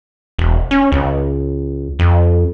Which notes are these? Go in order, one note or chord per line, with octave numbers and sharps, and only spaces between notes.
E1
C#4
C#2
F2